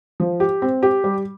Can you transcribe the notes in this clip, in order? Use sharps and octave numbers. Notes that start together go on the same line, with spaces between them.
F3
G4
C4
G4
G3